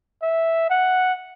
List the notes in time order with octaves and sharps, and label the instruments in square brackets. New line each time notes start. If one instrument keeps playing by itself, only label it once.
[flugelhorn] E5
F#5